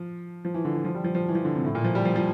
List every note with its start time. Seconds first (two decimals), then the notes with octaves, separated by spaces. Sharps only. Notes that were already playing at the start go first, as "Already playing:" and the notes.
Already playing: F3
0.45 F3
0.54 E3
0.65 D3
0.74 E3
0.84 F3
0.95 G3
1.04 F3
1.15 F3
1.29 E3
1.35 F3
1.45 D3
1.55 C3
1.64 A2
1.75 A#2
1.84 F3
1.95 G3
2.05 F3
2.16 F3